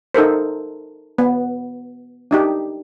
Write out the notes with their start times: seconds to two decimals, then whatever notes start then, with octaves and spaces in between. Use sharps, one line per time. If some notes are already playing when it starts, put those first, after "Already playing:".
0.14 D#4 A4 A#4 C5
1.18 B3
2.31 D4 D#4 G4